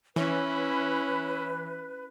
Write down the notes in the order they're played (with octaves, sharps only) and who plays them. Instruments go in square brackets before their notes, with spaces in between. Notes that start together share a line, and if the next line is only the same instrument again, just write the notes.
[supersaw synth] E3 [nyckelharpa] C#4 E4 [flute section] B4 [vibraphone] C#5